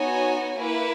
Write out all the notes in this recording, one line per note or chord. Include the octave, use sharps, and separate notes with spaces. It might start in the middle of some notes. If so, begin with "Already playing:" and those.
Already playing: B3 D#4 F#4 C#5 G#5
A#3 E4 B4